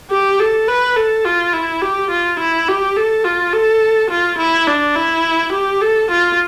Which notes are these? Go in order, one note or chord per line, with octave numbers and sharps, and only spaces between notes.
G4
A4
B4
A4
F4
E4
G4
F4
E4
G4
A4
F4
A4
F4
E4
D4
E4
G4
A4
F4